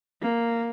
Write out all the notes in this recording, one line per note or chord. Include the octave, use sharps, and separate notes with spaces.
A#3